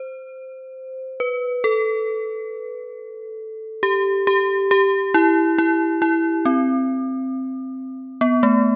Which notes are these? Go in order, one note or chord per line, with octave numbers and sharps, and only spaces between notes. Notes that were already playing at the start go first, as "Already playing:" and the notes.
Already playing: C5
B4
A4
G4
G4
G4
E4
E4
E4
C4
B3
A3